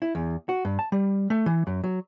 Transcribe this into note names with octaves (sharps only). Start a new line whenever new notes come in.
E4
E2
F#4
G2
A5
G3
A3
E3
F#2
F#3